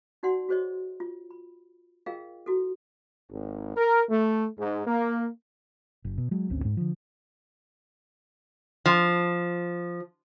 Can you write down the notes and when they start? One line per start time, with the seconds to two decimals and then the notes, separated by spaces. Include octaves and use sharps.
0.23 D#4 F#4 D5 F#5 C6
0.49 F#4 G#4 C5 C#5 D#5
1.00 F4
1.31 B5
2.06 F4 G#4 A#4 D#5 F5 G5
2.46 E4 F#4 A4
3.31 G#1
3.76 A#4
4.10 A3
4.58 G#2
4.87 A#3
6.05 F#1
6.18 B2
6.31 F#3 G#3
6.50 G#1 D2 C4 C#4
6.65 G#2
6.77 D3 F3
8.86 F3